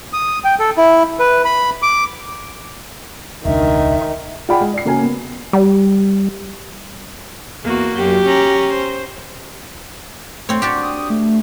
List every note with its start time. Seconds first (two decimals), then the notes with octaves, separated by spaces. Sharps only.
0.13 D#6
0.45 G5
0.59 A4
0.77 E4
1.20 B4
1.45 B5
1.82 D6
3.45 E1 C#2 D#3 D4 E5
4.49 F4 G#4 D5 F#5 G5 B5
4.61 G#3
4.74 D5 C7
4.85 C#3 A#3 C#4 F#4 A#4 G#5
5.02 B3
5.53 G3
7.64 E2 A#3 F#4
7.96 F#2 G4
8.27 C#4 A#5
8.70 C5
10.49 A3 C4 C#5
10.62 D4 F#4 G4 C#6
10.82 D#6
11.10 A3